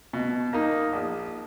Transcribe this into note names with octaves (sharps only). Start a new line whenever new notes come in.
B2
A#3 D#4
A#1